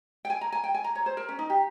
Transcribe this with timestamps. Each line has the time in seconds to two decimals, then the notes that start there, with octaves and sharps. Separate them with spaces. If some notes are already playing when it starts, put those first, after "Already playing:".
0.25 G5
0.30 G#5
0.41 A#5
0.52 G#5
0.64 G5
0.74 G#5
0.84 A#5
0.95 C#5
1.06 C5
1.17 A#4
1.29 C#4
1.39 D#4
1.50 G4